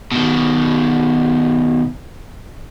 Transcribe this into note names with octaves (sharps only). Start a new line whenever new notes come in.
B2 D#3